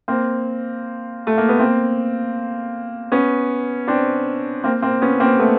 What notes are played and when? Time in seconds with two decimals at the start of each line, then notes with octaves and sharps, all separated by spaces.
0.08 A#3 C4
1.27 A3
1.38 A#3
1.49 B3
1.59 A#3 C4
3.12 B3 C#4
3.87 C4 D4
4.64 A#3 C4
4.82 A#3 C4
5.02 B3 C#4
5.20 A#3 C4
5.39 A3 B3